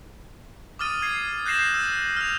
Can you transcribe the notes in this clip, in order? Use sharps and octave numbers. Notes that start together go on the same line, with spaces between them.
D6 D#6 F6 A6 D#7
G#6 C7
F#6 G6 A#6 C7 E7 F#7
E6
F6 F7